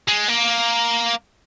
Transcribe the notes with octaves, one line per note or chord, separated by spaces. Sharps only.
G#3
A#3